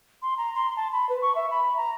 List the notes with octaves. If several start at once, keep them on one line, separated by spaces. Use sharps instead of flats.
C6
A#5
C6
A5
B5
B4
C#6
E5
B5
A#5